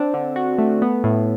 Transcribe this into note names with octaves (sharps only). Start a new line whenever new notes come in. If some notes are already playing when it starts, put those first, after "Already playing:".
Already playing: C4 D4
D3
F#4
A3
B3
A2